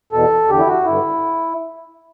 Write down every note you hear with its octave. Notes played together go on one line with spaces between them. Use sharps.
E2 B2 A4
E2 D3 G4
E4
F#4
G2 D3 E4